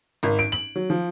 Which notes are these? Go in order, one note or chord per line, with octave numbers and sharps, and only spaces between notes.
G#1
D7
F#7
F#3
F3